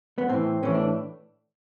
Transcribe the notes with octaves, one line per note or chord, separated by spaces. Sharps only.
B3
A2 E3 C4
A2 E3 C#4
D4